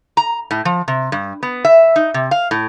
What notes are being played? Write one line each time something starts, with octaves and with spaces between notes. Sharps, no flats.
A#5
A2
F3
C3
G2
B3
E5
D#4
C3
F5
A2